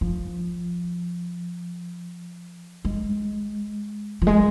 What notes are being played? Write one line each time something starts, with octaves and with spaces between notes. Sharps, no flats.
F3
G#3
F3
G#3